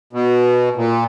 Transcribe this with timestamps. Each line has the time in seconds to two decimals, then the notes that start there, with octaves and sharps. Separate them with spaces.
0.13 B2
0.76 A#2